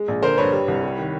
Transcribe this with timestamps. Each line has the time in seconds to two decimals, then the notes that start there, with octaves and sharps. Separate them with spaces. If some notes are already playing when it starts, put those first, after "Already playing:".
Already playing: G#3
0.08 A#1
0.23 D3 A#4 C5
0.38 G2 B4 C#5
0.53 G3
0.68 C2
0.83 G3
0.98 D#3